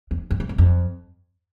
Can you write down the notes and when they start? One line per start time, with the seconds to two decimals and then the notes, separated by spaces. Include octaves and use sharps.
0.11 E2
0.31 F2
0.40 G2
0.49 G#2
0.58 F2